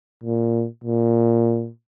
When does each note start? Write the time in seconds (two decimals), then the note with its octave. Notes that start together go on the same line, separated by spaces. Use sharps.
0.24 A#2
0.84 A#2